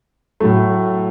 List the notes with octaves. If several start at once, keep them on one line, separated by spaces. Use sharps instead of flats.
A2 F#3 A3